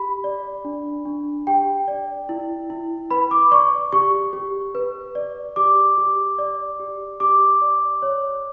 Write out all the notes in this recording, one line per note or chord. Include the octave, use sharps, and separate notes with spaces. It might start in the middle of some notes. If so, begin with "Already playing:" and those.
Already playing: G4 B5
D5
D4
D4
G4 G5
D5
E4
E4
B4 B5
D6
D5 C#6
G4 C#6
G4
B4
D5
G4 D6
G4
D5
G4
G4 D6
D5
C#5